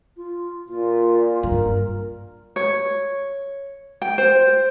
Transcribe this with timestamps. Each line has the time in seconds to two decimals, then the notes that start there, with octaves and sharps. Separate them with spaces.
0.17 F4
0.69 A#2 F4
1.43 G2 A#4
2.56 C#5
4.02 G5
4.18 C5